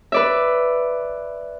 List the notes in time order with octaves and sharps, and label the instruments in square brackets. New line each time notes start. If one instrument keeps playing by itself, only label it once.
[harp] B4 D5 E5